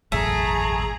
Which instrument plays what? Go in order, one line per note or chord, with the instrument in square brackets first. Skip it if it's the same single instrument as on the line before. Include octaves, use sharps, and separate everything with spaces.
[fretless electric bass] E1 A1 F#2 [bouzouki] A3 [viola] G#4 A#5